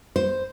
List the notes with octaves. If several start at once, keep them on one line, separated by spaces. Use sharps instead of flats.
C5